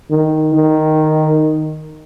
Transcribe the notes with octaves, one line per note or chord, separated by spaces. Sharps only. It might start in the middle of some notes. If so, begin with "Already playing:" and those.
D#3
D#3